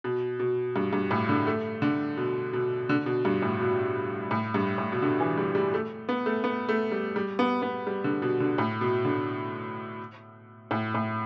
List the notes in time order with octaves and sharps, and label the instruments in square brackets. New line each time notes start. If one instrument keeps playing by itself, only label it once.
[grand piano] B2
B2
G2
G2
A2
D3
A3
D3
B2
B2
D3
B2
G2
A2
B2
A2
G2
A2
B2
D3
E3
G3
G3
A3
B3
A3
B3
A3
G3
G3
B3
B3
G3
D3
B2
D3
A2
B2
D3
A2
A2